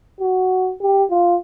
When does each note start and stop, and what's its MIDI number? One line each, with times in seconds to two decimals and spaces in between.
0.21 0.73 66
0.82 1.05 67
1.11 1.36 65